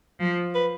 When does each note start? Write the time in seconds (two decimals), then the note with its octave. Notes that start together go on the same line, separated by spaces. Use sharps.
0.20 F3
0.55 B4